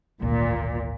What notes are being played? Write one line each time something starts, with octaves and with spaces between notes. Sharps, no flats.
G#1 D2 A#2